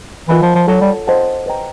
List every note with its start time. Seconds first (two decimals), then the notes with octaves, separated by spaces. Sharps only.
0.28 E3 F4 A#4 D#5 F#5 B5
0.42 F3
0.55 F3
0.67 F#3 A4 C#5 F#5 A5
0.81 G3
1.07 C5 D#5 F#5 A5
1.46 B4 D#5 G5 A#5